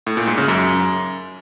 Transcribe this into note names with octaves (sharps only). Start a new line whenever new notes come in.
A2
A#2
G#2
C#3
F#2